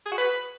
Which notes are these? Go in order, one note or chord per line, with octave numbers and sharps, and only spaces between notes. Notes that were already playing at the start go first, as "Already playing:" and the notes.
G#4
F#4
B4